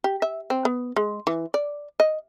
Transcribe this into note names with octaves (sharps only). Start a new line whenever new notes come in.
G4
E5
C4
B3
G#3
E3
D5
D#5